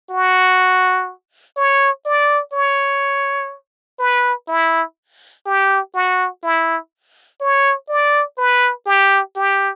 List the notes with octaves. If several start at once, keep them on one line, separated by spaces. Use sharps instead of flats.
F#4
C#5
D5
C#5
B4
E4
G4
F#4
E4
C#5
D5
B4
G4
G4